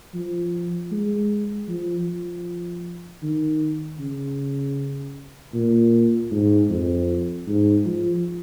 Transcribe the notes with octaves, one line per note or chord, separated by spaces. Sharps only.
F3
G#3
F3
F3
D#3
C#3
A#2
G#2
F2
G#2
F3